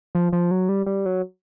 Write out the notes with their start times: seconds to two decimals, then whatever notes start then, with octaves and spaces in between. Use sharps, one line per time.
0.15 F3
0.33 F3
0.51 F#3
0.69 G3
0.86 G3
1.06 F#3